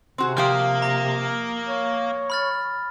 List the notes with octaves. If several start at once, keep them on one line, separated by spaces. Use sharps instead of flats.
C3 C4 F#4 G#4
F3 A#3 G4 F5 D#6 F6
A#5 A#6
C#5
B5 F6 A6